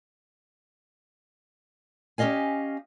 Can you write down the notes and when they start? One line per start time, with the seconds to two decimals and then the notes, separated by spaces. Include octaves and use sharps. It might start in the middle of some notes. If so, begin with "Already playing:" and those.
2.18 C#4 G4 G#4 D#5 F5 G#5